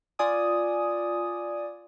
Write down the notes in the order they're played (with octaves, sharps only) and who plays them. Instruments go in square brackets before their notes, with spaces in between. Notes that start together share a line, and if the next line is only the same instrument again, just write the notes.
[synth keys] F4 D5 G#5 D#6